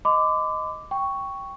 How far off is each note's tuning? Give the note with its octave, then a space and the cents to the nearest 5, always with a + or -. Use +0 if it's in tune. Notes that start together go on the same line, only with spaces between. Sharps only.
D#5 +0 B5 +45 D6 -5
G5 +0 C#6 +0